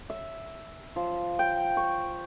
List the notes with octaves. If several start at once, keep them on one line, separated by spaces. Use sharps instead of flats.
E5
F3
G5
C#6